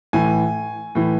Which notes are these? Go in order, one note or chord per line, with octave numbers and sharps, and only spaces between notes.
A2 E3 G#5
A2 E3